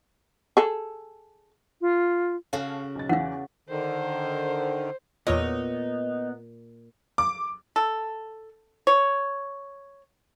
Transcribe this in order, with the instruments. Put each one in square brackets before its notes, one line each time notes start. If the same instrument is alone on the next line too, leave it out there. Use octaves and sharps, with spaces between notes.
[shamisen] G#4 A4
[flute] F4
[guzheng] C#3 F#4 [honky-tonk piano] C#4 A4 F5
[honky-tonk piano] B1 A6
[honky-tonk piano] E2 E3 [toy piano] F5 F#5
[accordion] D3 D#3 [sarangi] C5
[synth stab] E2 C#5 D#5 [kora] A#2 [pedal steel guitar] B3 [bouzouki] D#4
[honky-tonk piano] D6
[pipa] A4
C#5